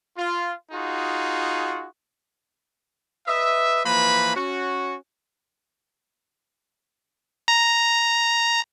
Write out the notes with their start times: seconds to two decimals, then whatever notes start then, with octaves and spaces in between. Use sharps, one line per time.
0.17 F4
0.71 D#4 F4 F#4 G#4
3.28 B4 D#5 E5
3.85 E3 F3 A#3 B4 B5
4.36 C#4 F#4
7.48 A#5